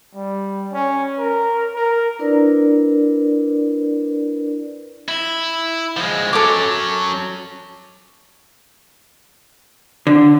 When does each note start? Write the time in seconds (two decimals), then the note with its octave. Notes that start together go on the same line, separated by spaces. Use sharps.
0.15 G3
0.73 C#4
1.19 A#4
1.75 A#4
2.19 D4 E4 A#4 B4 D5
5.08 E4
5.97 F3 G#3
6.33 F#3 C#4 A4 D6
10.07 D3